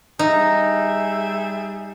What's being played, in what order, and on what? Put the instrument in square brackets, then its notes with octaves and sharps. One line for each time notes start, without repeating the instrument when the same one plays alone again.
[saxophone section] G3 G#4 E5 [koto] D#4